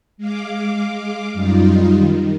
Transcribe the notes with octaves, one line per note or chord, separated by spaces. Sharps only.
G#3 F5 D6
F#2 G3 D#4 F4
D#3